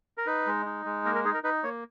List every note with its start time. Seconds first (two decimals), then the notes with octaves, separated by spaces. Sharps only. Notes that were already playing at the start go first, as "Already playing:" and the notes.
0.18 A#4
0.26 D#4 B4
0.47 G#3
0.66 D#4
0.85 G#3
1.05 A#3 A#4
1.15 A#4
1.24 D#4 G#4
1.34 A#4
1.44 D#4 B4
1.63 A#3 C#5